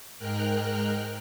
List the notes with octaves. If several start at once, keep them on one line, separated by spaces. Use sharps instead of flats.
G#2 G#3 A#4 G5 F6 F#6